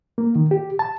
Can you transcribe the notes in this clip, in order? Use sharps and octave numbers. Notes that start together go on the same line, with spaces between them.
A#3
D#3
G4
A5